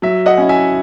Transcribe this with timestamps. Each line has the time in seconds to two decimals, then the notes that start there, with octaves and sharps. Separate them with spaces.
0.02 F#3 E5
0.26 D#5 F#5
0.38 C#4 E4
0.49 E5 G#5